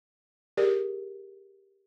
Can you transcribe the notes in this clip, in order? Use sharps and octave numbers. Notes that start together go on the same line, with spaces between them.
G4 G#4 A#4 D5